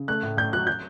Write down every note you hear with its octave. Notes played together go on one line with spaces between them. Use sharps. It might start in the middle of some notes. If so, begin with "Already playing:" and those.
Already playing: C#3
A3 F#6
A2
A2 G6
F#3 F#6
F#3 G6